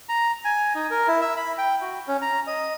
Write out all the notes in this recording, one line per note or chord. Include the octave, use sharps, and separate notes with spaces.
A#5
G#5
D#4
A#4
E4
E5
B5
G5
F#4
C#4
A#5
D#5